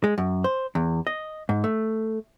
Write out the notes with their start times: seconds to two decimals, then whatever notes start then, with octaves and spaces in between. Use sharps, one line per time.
0.04 G#3
0.18 F#2
0.44 C5
0.75 E2
1.07 D#5
1.49 G#2
1.64 A3